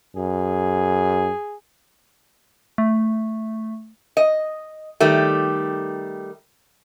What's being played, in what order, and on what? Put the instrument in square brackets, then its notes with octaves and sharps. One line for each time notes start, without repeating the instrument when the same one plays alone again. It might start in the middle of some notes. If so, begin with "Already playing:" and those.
[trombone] F#2 [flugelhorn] G#4
[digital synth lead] A3
[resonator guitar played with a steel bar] D#5
D#3 G3 A3